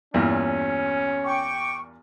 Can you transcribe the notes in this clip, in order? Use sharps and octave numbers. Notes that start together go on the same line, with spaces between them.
E2 G2 A#2 C#4
G5 C#6 D6